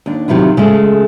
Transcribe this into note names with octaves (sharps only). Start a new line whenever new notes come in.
D#2 D4
C3 D#3 F#3 E4 F4
C#3 G#3 A3